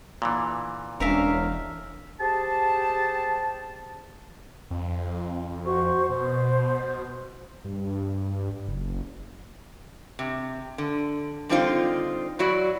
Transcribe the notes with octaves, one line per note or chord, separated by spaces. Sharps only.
A#2 D3 E3
E1 C#4 D4 A#4 E5 F5
G4 G#4 C5 A5
F2
F#4 C5 C#6
B2 C5
G2
F#1
C3
D3
D3 G3 C4 D#4 F4 C5
F#3 E4 F#4 D5